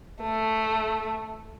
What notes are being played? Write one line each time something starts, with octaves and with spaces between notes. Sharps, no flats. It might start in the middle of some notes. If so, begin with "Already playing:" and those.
A3